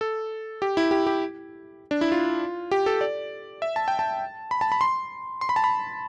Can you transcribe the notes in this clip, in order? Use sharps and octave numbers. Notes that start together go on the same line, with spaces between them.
A4
G4
E4
G4
G4
D4
E4
F4
G4
A4
D5
E5
A5
G5
A5
B5
A5
B5
C6
C6
B5
A5
B5